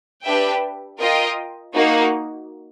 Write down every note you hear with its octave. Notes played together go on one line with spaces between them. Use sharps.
D4 G4 B4 E5 G5
F4 A#4 D#5 G5
A#3 D#4 F#4